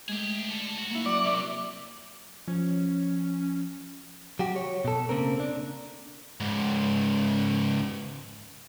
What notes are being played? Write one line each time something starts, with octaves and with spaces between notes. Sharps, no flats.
G#3 A3 G4 G#4
D4 A4
B1 F#4
A#3 E4
F#3 C#4 D5 F#5
C3 A#4 E5 C#6
F3 C#4
F#3 F#4 G4
C#5
B2 A4
C#3 A#3 C4 A#4
D4
C#2 G#2